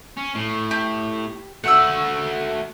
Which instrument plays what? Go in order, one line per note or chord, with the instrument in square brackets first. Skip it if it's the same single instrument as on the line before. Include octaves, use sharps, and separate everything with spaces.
[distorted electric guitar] C#4
A2
[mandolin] G4
[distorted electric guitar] A3 F#4 [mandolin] F#5 E6